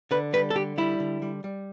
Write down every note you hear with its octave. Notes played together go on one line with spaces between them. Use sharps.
D3 B4
G3 B4
A4
D3 G4
G3 E4
D3
G3
G3